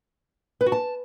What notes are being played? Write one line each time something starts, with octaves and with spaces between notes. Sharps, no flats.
B4
F#4
A5